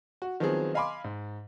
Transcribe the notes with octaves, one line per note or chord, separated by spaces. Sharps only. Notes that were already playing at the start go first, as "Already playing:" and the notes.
F#4
D#3 F3 F#3 B3 C4 G#4
D#5 F5 G#5 B5 C6 D6
G#2